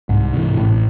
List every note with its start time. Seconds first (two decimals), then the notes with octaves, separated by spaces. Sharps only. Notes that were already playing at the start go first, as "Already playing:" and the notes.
0.09 C2 G#2
0.34 C3 E3
0.57 A1 A2